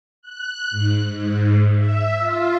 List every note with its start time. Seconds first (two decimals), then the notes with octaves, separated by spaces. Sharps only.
0.22 F#6
0.71 G#2
1.07 G#2
1.75 E5
2.19 F4